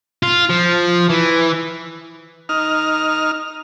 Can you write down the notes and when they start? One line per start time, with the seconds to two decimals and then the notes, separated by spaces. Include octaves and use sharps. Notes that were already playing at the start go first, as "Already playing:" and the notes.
0.23 F4
0.50 F3
1.09 E3
2.49 D#4 F6